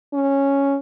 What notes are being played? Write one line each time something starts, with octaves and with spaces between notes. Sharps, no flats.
C#4